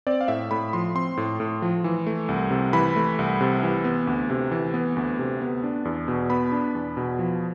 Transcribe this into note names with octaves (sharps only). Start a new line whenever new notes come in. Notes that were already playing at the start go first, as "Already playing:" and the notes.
C4 D5
F5
A2 E5
A2 B5
F3 C6
C4 C6
A2
A2
F3
E3
A3
C2
C3
E3 B5
A3
C2
C3
E3
B3
D2
C3
E3
B3
D2
C3
B3
D4
E2
B2
B3 B5
D4
E2
B2
F3